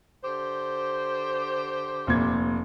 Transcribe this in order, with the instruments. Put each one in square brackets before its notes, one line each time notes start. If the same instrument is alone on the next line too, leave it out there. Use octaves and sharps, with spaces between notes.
[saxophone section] D3 G4 C5
[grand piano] F1 A#2 G#6